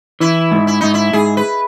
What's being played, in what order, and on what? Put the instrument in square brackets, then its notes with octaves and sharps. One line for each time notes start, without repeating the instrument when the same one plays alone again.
[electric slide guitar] E3 [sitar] E4
[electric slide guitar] G#2
[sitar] E4
[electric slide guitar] G#2 [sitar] D#4
[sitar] E4
[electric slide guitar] G#2 [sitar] G#4
[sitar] B4